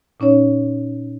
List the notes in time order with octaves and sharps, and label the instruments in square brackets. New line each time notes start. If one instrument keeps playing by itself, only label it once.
[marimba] A#2 C#4 D#4 C#5